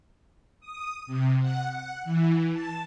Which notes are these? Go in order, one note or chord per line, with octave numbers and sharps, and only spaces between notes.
D#6
C3
F#5
F#5
E3
A5